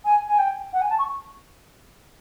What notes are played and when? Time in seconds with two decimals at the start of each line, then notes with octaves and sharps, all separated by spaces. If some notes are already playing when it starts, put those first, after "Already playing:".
0.05 G#5
0.28 G#5
0.38 G5
0.73 F#5
0.81 G#5
0.90 A5
0.99 C#6